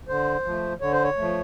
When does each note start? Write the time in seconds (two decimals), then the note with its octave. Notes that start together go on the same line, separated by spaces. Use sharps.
0.08 D3 C5
0.45 F3 A3
0.81 D3 C#5
0.92 C5
1.03 C#5
1.17 F3 A3